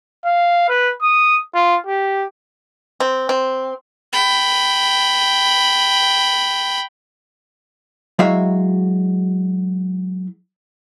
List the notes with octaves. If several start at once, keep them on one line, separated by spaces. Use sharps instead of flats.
F5
B4
D#6
F4
G4
C4
C4
G5 B5
F#3 G#3 E4 F#4 E5 F5